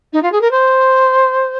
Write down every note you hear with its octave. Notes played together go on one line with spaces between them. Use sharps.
D#4
F4
G#4
A#4
C5